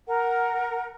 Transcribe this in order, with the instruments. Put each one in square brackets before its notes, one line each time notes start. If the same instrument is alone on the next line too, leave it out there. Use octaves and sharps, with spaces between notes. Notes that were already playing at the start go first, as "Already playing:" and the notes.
[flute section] A#4 F#5